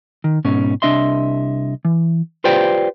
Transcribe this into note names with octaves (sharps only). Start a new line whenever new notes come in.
D#3
G#2 B2 C#4
C2 D4 D#5 E5 C6
E3
F4 G4 B4 C5 D5 G5